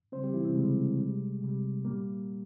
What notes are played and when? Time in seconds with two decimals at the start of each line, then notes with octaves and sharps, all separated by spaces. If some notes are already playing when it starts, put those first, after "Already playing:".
0.12 C#3 G3 C4 C5
0.24 G3 G4
0.34 E3 E4
0.45 C3 C4
0.55 C#3 G3 G#3
0.98 C3 G3
1.41 C3 G3
1.85 A#2 G3 A#3